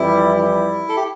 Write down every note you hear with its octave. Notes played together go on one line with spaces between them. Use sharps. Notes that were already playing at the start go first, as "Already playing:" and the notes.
Already playing: F2 E3 G3 E4
E4
A4
G4